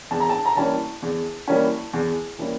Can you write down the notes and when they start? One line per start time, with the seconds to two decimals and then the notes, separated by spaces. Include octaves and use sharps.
0.11 E2 A5
0.20 A#5
0.29 A5
0.46 A#5
0.56 E3 G3 A#3 C#4 A5
1.02 E2
1.48 E3 G3 A#3 C#4
1.93 E2
2.38 E3 G3 A#3 C#4